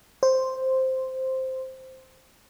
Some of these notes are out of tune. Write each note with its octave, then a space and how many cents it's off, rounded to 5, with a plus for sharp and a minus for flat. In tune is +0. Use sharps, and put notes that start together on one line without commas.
C5 +0